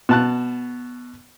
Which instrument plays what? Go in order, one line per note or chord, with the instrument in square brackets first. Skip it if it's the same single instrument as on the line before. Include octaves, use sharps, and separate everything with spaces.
[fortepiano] B2 A5 F#6